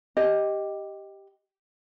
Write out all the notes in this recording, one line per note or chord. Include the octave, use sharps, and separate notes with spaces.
G4 D#5